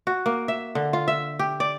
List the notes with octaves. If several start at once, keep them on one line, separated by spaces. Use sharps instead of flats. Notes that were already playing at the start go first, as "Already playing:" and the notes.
F#4
A#3
E5
D3
F4
E5
G4
D5